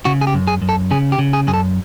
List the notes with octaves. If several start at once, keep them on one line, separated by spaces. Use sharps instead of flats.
C#3 F#4
G#4
G4
F#2
G#4
F#2
A4
C#3 G#4
G4
C#3
G#4
F#2 G#4
A4